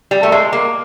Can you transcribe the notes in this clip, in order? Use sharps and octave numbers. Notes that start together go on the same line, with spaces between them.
G3
A3
G#3
A#3